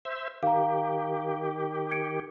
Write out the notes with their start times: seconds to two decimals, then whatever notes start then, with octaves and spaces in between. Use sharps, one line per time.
0.05 C5 E5
0.43 D#3 G4 F5 A#5
1.91 G#6 C#7 D7